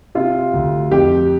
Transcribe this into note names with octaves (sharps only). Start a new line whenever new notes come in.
C3 F4
D2
F2 G4